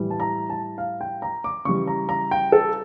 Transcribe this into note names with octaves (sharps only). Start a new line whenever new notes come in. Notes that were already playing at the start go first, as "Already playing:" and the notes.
Already playing: A2 E3 G3
A5
A#5
A5
F5
G5
A#5
D6
C#3 E3 G3 C#6
A#5
A#5
G5
A4